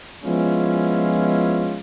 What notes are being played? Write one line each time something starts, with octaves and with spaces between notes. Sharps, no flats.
F3 G#3 B3 C#4 E4 F4